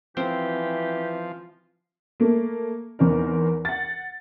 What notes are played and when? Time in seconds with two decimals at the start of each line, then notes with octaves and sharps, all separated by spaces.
0.17 E3 F3 C4 G4
2.20 A3 A#3
2.99 E2 C4 D#4 A#4
3.65 F#5 A6